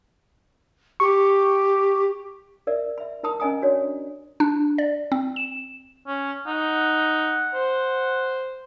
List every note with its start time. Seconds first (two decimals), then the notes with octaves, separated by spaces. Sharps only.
1.00 G4 C#6
2.67 A#4 D5 E5
2.98 E5 B5
3.23 E4 A#4 A5 B5 D#6
3.40 C#4 A#4 D#5 G#5 A#5 D#6
3.62 D4 F#4 C#5 D5
4.40 D4
4.78 D5
5.12 C4
5.36 E7
6.07 C#4
6.47 D#4 F#5
7.54 C5